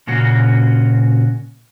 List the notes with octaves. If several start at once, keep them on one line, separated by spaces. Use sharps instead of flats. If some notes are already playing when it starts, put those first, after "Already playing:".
A#2 C#3 A#3 C#4 F#4